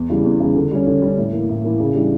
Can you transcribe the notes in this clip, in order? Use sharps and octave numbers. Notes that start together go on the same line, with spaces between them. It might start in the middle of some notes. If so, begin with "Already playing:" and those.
Already playing: E2
C#3 E3 G3
E2
C#3 E3 G3
D3
G3 C#4
D3
G3 C#4
A2
E3 A#3
A2
E3 A#3
C#3
E3 G3 D4 G4